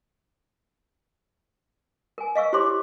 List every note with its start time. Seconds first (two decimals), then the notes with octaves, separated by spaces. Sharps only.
2.18 A#4 G#5
2.35 D#5 F5 C#6 E6
2.53 E4 G4 C5 C#5 C6 D6